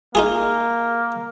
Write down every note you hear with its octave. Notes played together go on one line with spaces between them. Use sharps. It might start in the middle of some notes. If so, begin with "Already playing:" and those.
A#3 D#4 F4 G#4